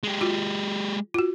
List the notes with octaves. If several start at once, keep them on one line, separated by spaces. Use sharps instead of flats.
G#3 G4
F4 F#4
F4 F#4